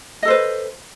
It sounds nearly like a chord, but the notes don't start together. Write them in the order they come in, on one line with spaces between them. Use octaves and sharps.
D#5 A4 C5 B4